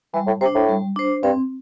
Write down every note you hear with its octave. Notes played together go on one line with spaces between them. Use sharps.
E3 G3
A2
C3 D4 C5
A2
G3
D4 C5
G2 C4